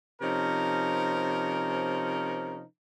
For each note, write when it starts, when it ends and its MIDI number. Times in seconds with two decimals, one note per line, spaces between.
0.22 2.63 48
0.22 2.63 53
0.22 2.63 61
0.22 2.63 63
0.22 2.63 70